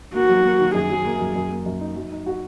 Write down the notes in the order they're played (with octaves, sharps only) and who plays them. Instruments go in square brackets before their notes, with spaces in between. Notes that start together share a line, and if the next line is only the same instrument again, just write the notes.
[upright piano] A#3 [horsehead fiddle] F#4
[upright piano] F#3
A#3
D#3
[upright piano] F#2 [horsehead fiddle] G#4
[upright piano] F#3
A#3
F#2
F#2
A#3
F#2
D#4
F#3
D#4
F#4